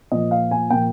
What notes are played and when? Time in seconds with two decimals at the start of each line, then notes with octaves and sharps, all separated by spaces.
0.12 A#2 F3 A#3 D#5
0.31 F5
0.51 G#5
0.70 A#2 F3 A#3 G5